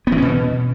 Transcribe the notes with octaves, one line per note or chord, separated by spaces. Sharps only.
B3
E3
C#4
B2